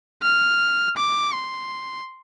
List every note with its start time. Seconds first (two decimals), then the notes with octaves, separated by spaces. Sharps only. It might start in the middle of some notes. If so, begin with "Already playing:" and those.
0.22 F6
0.97 D6
1.33 C6